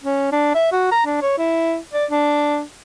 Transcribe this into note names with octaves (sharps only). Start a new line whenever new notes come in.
C#4
D4
E5
F#4
A#5
D4
C#5
E4
D5
D4